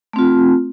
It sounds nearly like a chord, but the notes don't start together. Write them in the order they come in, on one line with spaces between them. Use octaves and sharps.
A3 C4 F4